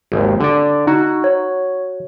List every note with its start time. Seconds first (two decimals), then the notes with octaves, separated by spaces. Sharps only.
0.12 G#1 D#2
0.40 D3 D5
0.87 D#4 F#4
1.24 C#5